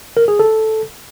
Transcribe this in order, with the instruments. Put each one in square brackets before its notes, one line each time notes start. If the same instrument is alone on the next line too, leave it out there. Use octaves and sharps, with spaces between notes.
[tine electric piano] A#4
G#4
A4